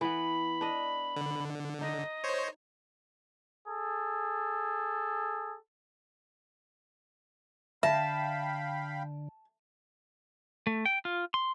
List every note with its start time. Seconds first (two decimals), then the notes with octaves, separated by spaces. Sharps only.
0.01 E3 B3 B5
0.61 D4 D#5
1.16 D3
1.81 D#4 D#5
2.24 C5 C#5
3.68 G#4 A4
7.83 D3 E5 F5 G5 A5 B5
10.67 A3
10.86 G5
11.05 F4
11.34 C6